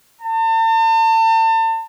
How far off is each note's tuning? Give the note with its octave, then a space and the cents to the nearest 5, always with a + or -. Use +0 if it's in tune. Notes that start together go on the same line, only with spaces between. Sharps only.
A5 +40